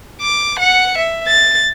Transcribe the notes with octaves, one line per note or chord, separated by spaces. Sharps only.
D6
F#5 C#7
E5
A6